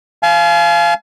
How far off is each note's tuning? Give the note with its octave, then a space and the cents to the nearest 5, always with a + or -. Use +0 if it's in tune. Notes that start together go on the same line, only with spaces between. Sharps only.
F5 -20 G#5 +45